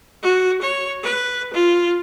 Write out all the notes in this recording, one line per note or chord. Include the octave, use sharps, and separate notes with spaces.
F#4
C#5
B4
F4